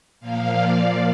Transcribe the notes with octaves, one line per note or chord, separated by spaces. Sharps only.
A#2 F3 A#3 F5
D5